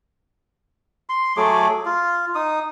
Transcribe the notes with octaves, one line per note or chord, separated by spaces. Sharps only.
C6
F#3 A3 G#4 D6
F4
D#4 D#6